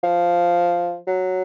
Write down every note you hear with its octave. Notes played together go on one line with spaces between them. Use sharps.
F3
F#3